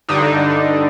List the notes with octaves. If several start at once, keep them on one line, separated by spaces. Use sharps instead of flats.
G2 D3 D4 D#4